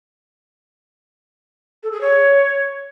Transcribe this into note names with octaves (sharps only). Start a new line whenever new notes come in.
A4
G#4
C#5